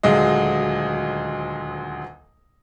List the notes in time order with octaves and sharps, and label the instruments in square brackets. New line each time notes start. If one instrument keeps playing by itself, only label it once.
[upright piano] D#1 D2 F#3 G#3 D#5